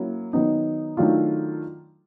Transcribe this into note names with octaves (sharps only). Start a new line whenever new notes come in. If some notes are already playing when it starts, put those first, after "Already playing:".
Already playing: F#3 A#3 C#4 E4
D#3 F#3 B3 D#4
D#3 F#3 A3 D4 F4